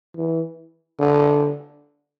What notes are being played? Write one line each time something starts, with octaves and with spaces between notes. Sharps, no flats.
E3
D3